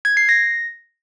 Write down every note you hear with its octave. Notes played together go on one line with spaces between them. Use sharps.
G#6
C7
A#6